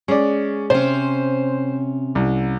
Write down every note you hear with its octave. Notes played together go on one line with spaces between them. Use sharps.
G#3 C#4 D5
C3 C#4 C5
C2